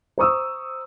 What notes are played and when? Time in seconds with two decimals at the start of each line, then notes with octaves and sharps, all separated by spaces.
0.18 C5 A#5 C#6 D#6 E6